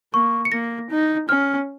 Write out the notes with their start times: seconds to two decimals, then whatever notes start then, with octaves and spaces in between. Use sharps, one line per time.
0.14 A#3 C#6
0.45 C#7
0.52 A#3 A#6
0.90 D#4
1.29 C#4 F6